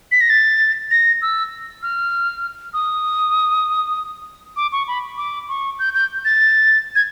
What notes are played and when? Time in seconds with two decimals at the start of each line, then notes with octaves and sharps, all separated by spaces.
0.12 B6
0.21 A#6
0.30 A6
0.91 A#6
1.22 E6
1.83 F6
2.74 D#6
4.56 D6
4.72 C#6
4.88 B5
5.18 D6
5.49 C#6
5.79 G6
5.95 G6
6.25 A6
6.95 G#6